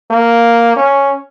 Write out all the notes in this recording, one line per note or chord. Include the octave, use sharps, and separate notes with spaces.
A#3
C#4